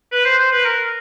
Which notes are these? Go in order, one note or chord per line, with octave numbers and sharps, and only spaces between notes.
B4
C5
C5
B4
A#4